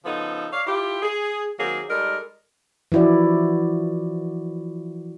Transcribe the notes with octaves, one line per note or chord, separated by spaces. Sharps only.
C#3 F3 B3 D#4 A4
C#5 D5 F5
E4 F4 G4
G#4
D#3 F#3 A#3 C4 G#4
G3 G#3 D#4 A4 A#4
E3 F3 E4 F#4 D5